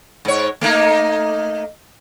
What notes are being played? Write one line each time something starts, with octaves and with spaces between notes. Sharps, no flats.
G#2 C#5
A3 A#3 D#4